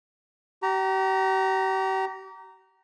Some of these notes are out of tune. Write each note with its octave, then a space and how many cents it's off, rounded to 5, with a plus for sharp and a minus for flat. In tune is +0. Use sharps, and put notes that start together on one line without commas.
G4 -40 A#5 -5